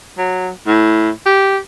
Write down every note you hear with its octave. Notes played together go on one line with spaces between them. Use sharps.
F#3
A2
G4